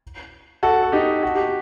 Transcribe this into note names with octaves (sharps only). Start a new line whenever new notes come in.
F#4 A4
A4
D#4 G4
F#4
G4